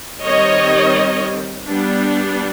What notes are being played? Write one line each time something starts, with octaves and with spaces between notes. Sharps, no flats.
D#3 G3 C4 C#5 D#5
G3 B3 D4